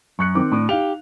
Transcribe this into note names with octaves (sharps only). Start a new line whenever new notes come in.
F#2 C#6 F#6 C#7
D#3 C4 D6
A2 D4
D#4 G4 F5 F7